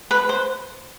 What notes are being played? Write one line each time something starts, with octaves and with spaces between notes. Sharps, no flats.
B4
C5